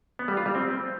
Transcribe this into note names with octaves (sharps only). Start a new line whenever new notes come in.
B3
G3
F4
G3
C4